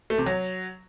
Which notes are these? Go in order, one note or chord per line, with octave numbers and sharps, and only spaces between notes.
A3
C3
F#3